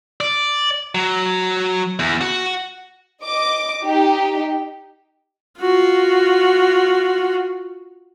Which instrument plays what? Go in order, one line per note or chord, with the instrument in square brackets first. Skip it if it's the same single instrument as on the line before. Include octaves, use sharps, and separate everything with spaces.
[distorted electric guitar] D5
F#3
E2
F#4
[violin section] D#5 D6
D#4 G4
[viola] F4 F#4